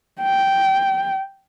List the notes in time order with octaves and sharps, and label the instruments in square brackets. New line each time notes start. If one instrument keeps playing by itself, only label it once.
[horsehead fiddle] G5